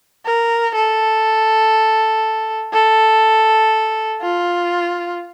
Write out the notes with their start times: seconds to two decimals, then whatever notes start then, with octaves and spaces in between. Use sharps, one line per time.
0.26 A#4
0.75 A4
2.73 A4
4.22 F4